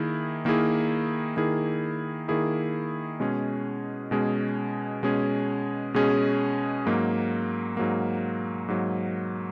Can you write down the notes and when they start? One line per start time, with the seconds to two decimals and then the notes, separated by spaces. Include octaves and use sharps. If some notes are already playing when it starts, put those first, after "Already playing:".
Already playing: D#3 A#3 E4 G#4
0.45 D#3 A#3 E4 G#4
1.36 D#3 A#3 E4 G#4
2.28 D#3 A#3 E4 G#4
3.20 B2 G#3 C#4 G#4
4.11 B2 G#3 C#4 G#4
5.03 B2 G#3 C#4 G#4
5.94 B2 G#3 C#4 G#4
6.86 G#2 F#3 A#3
7.77 G#2 F#3 A#3
8.68 G#2 F#3 A#3